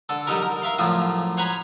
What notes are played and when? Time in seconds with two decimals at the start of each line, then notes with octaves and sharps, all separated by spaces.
0.09 D3 A4
0.27 D3 F#3 G3 D#4 G4 A#4
0.42 A#4
0.62 A#4 E5 F5 C6
0.79 F#2 A2 C#3 F3
1.37 C5 C#5 F#5 G#5 A#5 B5